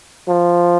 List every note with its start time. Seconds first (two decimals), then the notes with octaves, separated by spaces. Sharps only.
0.28 F3